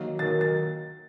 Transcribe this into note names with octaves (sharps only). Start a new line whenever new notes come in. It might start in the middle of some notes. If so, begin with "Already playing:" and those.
Already playing: D#3 F#3 A#3
D#3 F#3 A#3 A6
A6